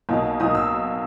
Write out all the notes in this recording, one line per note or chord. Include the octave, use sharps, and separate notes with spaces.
B1 B2 A#3 D#4
B1 B2 A#3 D#4 D#6
E6